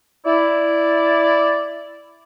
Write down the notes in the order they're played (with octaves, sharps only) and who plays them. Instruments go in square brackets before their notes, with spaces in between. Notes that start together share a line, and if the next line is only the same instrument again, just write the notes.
[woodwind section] E4 D5